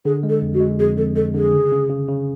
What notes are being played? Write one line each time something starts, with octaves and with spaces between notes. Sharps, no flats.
D3 G#4
G#3
A4
F2
F#4
G#3
F2 G#4
F2 A4
G#3 A4
D3 G#4
C#3
C#3
C#3
C#3